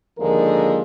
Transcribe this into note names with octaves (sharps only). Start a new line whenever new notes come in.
D#2 D3 F3 G#3 A#4